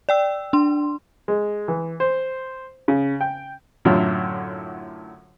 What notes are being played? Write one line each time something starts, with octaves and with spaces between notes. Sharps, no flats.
D5 G5 E6
D4 C6
G#3
E3
C5
C#3
G5
F#2 A2 D3 F#3 E4 F4